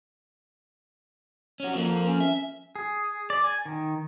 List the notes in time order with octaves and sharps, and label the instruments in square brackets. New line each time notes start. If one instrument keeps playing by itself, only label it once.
[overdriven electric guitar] C#4 F#4
[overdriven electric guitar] F3 C4 [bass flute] A#3
[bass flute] C#4
[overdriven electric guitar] E5
[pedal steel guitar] G#4
D5
G#5
D#3